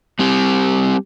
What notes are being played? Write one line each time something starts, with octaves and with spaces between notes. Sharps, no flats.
G3 C4 G4